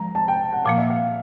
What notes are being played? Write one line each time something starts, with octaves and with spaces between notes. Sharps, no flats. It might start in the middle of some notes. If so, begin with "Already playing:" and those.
Already playing: F3 G#3 A#5
A5
G5
F#5
A#2 F3 A#3 F5
E5
F5